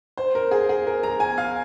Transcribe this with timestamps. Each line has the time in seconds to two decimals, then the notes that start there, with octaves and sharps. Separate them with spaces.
0.17 C5
0.35 A#4
0.51 G#4
0.69 G#4
0.87 A#4
1.03 A#5
1.20 G#5
1.38 F5